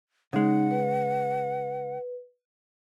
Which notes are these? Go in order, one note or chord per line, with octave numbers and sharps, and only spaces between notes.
C#3 G#3 D#4 F#5
B4